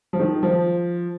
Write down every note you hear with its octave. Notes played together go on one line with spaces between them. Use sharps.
F3
D#3
F3